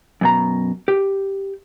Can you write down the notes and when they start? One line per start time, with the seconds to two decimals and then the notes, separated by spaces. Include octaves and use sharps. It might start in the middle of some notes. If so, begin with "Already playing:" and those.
0.21 F#2 B2 A#5
0.88 G4